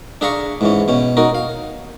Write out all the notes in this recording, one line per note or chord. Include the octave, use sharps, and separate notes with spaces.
D4 G#4 E5 F5 A#5 C#6
G#2 E3 C#4
B2 C#4
D#4 F#4 A#4
F5